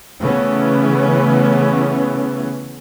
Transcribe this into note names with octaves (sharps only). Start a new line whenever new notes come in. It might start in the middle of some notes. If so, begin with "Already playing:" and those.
C#3 E3 A3 B3 C#4